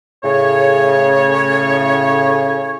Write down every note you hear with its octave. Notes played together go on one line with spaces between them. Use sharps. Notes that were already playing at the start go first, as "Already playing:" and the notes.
A2 C#3 C#5